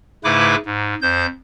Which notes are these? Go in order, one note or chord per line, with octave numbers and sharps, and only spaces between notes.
G#2 C#3 A3 E4 B4 D6
G#2
F2 C5 G6